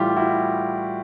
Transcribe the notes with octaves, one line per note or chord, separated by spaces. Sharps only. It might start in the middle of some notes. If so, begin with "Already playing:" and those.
Already playing: A2 E3 G3 F4 G4
E4 F#4